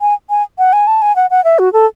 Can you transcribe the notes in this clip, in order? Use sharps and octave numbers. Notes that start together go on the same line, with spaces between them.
G#5
G#5
F#5
G#5
A5
G#5
F#5
F#5
E5
F#4
A4